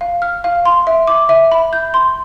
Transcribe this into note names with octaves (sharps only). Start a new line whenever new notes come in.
F5
F6
F5
C6
E5
D6
E5
B5
G6
C6